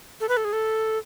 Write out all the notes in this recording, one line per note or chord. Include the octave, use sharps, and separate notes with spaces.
A4
B4
A4
G#4
A4